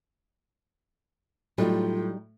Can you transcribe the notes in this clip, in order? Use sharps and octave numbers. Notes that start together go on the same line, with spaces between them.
A2 F#3 G3 D#4 F4